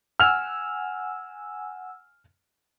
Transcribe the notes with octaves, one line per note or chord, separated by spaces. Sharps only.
F#5 G#5 E6 F6 F7